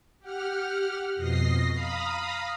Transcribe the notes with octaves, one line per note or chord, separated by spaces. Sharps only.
G4 F#5 F6
F2 B2 D#5 A#6 C7
F5 A#5 B5 D#6